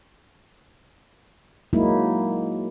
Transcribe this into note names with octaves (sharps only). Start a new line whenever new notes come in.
F#3 G#3 A#3 D#4 E4